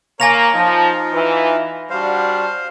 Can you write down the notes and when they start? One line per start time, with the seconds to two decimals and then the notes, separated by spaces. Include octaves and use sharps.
0.20 A#3 A#4 C#5 G#5 A#6 F7
0.54 F3 D#4 F4
1.12 E3
1.90 G3 D4 F#4 C5 F5